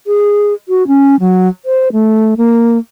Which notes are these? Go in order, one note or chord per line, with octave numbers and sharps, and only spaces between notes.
G#4
F#4
C#4
F#3
C5
A3
A#3